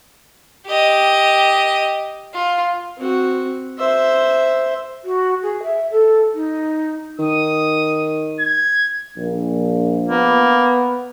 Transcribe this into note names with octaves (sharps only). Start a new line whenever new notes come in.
G4 D#5
F4
C4 F#4
C5 E5
F#4
G#4
E5
A4
D#4
D#3 D#6
G#6
A#1
A#3 B3